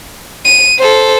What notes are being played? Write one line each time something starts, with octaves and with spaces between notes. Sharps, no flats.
D#7
A4 C5